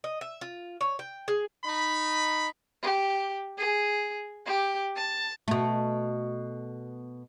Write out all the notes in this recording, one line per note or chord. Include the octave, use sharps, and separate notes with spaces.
D#5
E5
F4
C#5
G5
G#4
D#4 B5
G4
G#4
G4
A5
B2 A3